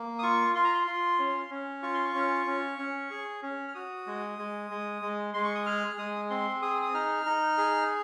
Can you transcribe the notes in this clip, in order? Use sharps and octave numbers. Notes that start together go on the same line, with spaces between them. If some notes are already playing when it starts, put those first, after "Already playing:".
Already playing: A#3
D#6
F4 C#6
F4 C6
A#5
C6
F4
C#4
C#4
F4 C#6
C6
C#6
C#4
C#4
C#4
G#4
C#4
F6
F#4 D#6
G#3
G#3
G#3
G#3
G#3 C6
C#6
D#6
G#4 F6
G#3 D#6
C4 C6
G#4 D#6
D#6
D#4 F6
D#4
G#4